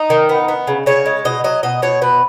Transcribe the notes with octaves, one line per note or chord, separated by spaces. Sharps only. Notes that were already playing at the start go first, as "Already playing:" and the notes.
Already playing: D#4
D#3
B3
B3
C#3
C#3 C#5
G#3
B2 D#5
F#3 D#5
B2 D#5
B2 C#5
B2 B4